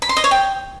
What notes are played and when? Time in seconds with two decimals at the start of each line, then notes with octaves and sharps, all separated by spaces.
0.02 B5
0.09 C6
0.17 D#5
0.24 C#5
0.31 G5